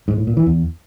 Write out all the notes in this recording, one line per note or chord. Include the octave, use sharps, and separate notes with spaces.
G#2
A2
A#2
E3
E2